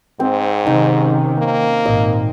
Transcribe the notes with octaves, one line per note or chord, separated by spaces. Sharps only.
G#2 C4
C3 D#3 C#4 D#4
A#3
G#1 A#2 D#5